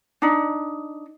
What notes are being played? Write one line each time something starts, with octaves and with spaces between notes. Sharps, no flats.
D4 D#4